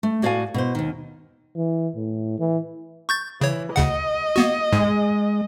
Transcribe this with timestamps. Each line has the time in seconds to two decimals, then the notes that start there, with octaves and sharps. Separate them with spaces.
0.03 A3
0.22 A2 F#4 D5 E5 F5 G#5
0.54 B2 E4 C5
0.75 D#2 D#3
1.56 E3
1.96 A2
2.39 E3
3.09 C#6 G6 A6
3.41 C#3 E3 C#5
3.76 D2 C#3 D#5 F#5
4.36 A#3 B3 F#4
4.72 G#2 G#3